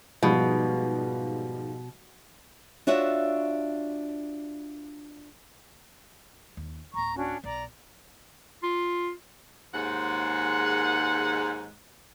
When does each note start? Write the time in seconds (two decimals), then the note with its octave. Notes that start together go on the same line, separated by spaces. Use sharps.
0.23 G#2 B2 F3 G3
2.87 D4 F4 F#4 C#5 E5
6.57 D#2
6.94 D1 A#3 A#5 C#6
7.15 C#4 D4 F#4
7.44 B1 D5 A#5
8.63 F4
9.74 D#2 G#2 G#3 F#5